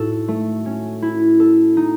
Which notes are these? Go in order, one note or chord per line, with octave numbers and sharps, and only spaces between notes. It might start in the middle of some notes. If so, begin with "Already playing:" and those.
Already playing: A2 D#4 F#4 A4
A3
C#4
E4
A4
D#4